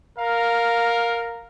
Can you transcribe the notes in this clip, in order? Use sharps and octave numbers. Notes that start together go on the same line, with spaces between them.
A#4 F5